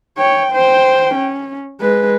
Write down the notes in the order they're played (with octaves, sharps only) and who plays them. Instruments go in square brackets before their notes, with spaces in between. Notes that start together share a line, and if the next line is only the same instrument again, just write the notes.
[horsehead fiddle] C#5 G5
C5 G5
C#4
G#3 B4